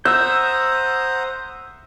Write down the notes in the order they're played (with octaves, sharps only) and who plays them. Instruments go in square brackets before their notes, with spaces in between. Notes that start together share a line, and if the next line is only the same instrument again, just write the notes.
[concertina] C5 [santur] E5 [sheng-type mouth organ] F#5 A#5 D#6 [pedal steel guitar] E6 G6